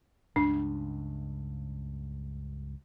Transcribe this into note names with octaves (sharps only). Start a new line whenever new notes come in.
C#2 G2 C#3 D4